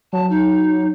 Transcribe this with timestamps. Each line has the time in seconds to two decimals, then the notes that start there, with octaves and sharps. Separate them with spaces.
0.13 F#3 A5
0.30 D#4